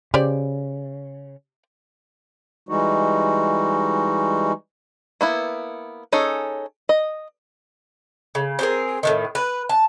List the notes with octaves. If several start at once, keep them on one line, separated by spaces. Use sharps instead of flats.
C#3 G4 C5 D5
E3 G3 G#3 D#4 F#4
A#3 B3 E4
C#4 D#4 G#4 A4
D#5
C#3
C4 G#4 A#4
A2 C3 D#3
B4
A5